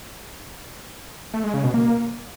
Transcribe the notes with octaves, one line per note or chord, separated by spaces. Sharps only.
A3
G#3
C#3
B2
A#3